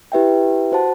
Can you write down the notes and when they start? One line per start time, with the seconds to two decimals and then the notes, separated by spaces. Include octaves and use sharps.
0.12 E4 G4 B4 E5 G5
0.72 F#4 C5 F#5 A5